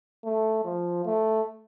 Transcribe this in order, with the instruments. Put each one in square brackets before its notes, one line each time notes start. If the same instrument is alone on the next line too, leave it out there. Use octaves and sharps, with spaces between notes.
[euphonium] A3
F3
A3